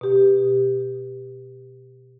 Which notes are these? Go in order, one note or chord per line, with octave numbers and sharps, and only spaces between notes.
B2 G4